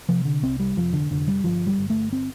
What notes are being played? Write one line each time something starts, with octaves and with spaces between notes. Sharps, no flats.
C3 F3
D3
C2 C4
G3
F1 F3
D3
F1 D3
G3
G1 F3
G3
G1
A3
C4